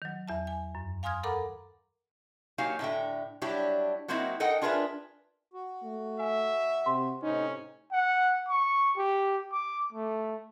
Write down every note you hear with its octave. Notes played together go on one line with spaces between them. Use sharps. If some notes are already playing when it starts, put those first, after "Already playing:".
D#3 F#3
E2 E5 A5
G#5
F#2
F5 G#5 C6 D#6 F6 G#6
A4 A#4 F#5 A#5 B5 D6
F#3 A#3 D#4 G4 F5 G#5
A2 D3 E5 G5
F#3 G3 D4 E4 G4
F#3 A#3 C4 D#4 E4 F#4
D#4 A4 A#4 D#5 F#5 G5
D4 F4 G#4 A#4 B4 E5
F#4
A3
E5 G#5
C3 C6
A2 C3 C#4 D#4
F#5
C#6
G4
D6
A3